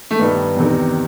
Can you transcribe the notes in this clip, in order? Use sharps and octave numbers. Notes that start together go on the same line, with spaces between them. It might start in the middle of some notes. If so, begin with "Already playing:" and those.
A3
G2 D#3 B3
E2 C3 D#3